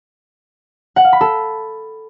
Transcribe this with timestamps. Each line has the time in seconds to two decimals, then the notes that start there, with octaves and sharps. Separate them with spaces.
0.96 F#5
1.04 F5
1.13 B5
1.21 A4